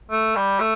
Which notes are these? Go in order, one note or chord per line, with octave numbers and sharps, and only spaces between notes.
A3
G3
A3